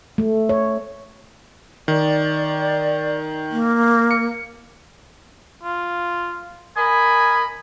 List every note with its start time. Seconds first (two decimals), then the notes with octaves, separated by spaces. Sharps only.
0.18 A3
0.49 C#5
1.88 D#3 D5
3.51 A#3
4.11 C#7
5.63 F4
6.76 A#4 D#5 G#5 B5